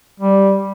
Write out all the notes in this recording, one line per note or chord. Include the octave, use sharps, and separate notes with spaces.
G3